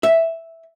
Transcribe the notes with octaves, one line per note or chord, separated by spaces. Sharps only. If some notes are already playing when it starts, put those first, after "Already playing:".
E5